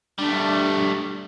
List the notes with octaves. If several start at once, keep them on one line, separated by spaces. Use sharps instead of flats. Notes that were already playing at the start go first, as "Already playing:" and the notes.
G3 A3 D4